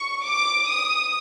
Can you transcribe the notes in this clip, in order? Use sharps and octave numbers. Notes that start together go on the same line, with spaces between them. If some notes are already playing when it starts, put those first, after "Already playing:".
Already playing: C#6
D6
D#6